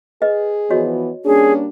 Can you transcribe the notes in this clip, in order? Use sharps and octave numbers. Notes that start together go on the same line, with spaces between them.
G#4 B4 D#5
E3 F3 B3 F#4 C#5 D#5
G3 A#3 C#4 D4 G#4